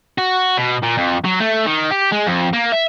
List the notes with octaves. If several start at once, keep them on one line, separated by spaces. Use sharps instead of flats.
F#4
B2
A#2
F2
F#3
A3
D#3
G4
G#3
F2
A#3
E5